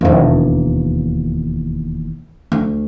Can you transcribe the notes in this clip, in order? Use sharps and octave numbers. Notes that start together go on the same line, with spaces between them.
E1 D#2
D2